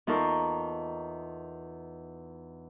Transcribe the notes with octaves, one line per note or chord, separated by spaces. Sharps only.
E2 D#4 F4 A4 A#4 C#6